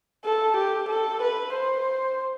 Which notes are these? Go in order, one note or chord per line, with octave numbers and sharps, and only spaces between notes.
A4
G4
A4
B4
C5